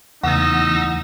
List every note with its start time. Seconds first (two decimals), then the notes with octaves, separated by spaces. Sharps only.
0.23 E2 C#3 A3 D#4 F#5 E6 A#6